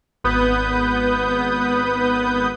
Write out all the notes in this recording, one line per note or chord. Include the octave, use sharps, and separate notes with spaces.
G#1 B3 B4 D#6 G6